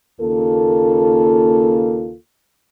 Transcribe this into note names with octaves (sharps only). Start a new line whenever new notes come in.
D#2 C#3 A#3 F4 A4